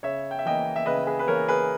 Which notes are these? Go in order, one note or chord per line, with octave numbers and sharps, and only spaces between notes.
C#3 C#5 E5
G5
E5
E3 A#3 D#5 G5
E5
C#3 B4 D#5
G#4 B4
B4
E3 A#3 A#4 C#5
G#4 B4